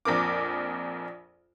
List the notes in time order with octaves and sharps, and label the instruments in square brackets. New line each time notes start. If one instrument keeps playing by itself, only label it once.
[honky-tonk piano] A#1 F2 A#4 D6